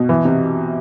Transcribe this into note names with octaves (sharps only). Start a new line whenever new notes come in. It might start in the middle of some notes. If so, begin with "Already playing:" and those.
Already playing: B2
E3
C3